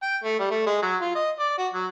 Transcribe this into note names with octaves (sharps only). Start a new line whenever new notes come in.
G5
A3
G3
A3
G#3
F#3
F4
D#5
D5
F#4
F#3